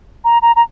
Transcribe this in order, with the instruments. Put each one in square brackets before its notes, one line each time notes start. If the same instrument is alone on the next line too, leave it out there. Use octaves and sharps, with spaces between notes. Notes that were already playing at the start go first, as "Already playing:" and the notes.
[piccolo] A#5
A#5
A#5